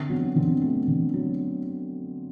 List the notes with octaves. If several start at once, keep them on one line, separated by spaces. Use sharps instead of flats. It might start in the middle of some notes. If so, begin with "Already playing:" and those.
Already playing: D3 C4
F#3 B3
D3 C4
A3
D3
F#3